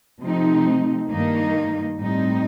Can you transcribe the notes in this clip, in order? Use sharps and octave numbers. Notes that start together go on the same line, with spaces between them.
C3 F3 A3 C4 D#4
G2 D#3 A#3 D#4
A2 G3 C4 D#4